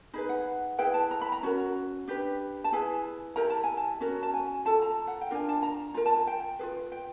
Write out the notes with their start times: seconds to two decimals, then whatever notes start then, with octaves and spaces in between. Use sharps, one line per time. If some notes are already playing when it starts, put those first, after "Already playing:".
0.14 D#4 G#4 B4 B5
0.29 F#5
0.78 E4 G#4 B4 G5
0.94 A5
1.11 A#5
1.21 B5
1.32 A#5
1.43 C#4 F#4 A#4
2.08 D4 G4 B4
2.64 A5
2.72 E4 G#4 B4 G#5
3.36 E4 G4 A#4 A#5
3.50 A5
3.64 G#5
3.77 A5
4.00 C#4 F#4 A#4
4.23 A5
4.34 G#5
4.65 F4 A4 A5
4.82 A#5
5.07 F#5
5.21 G5
5.31 D4 F4 A#4 G#5
5.49 A5
5.63 A#5
5.94 F4 A#4 A#5
6.06 A5
6.17 G#5
6.27 G5
6.59 G#4 B4
6.63 F4
6.92 G5